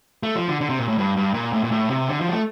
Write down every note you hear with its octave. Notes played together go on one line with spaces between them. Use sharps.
A3
F3
D3
D3
C3
A#2
A2
G2
G2
A#2
A2
A#2
A2
C3
D3
F3
G3
A3